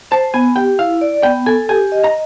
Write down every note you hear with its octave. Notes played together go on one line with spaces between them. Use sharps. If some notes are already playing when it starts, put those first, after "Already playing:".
C5 A5
B3 G#5
G4 G5
E4 F5
D5
B3 G5
A4 G#5
G4 G#5
D#5
A#5